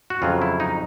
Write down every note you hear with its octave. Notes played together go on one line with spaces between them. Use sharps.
F#4
F2 C#3 F#3 F4
E4
D#4